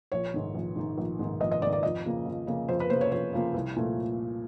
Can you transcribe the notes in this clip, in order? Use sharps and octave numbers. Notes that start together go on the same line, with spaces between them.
A#1 C#5
G#2 D#3
A#1
G#2 D#3
A#1
G#2 D#3
A#1 D#5
D#5
G#2 D5
D#3
D5
F2 D#5
C#3 F3 A#3
F2
C#3 F3 A#3
F2 C5
B4
C#3 F3 A#3 C5
C#5
F2 C#5
C#3 F3 A#3
C2
A#2 F3 A3